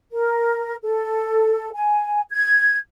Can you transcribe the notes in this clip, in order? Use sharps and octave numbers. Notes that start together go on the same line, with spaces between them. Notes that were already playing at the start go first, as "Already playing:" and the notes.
A#4
A4
G#5
G#6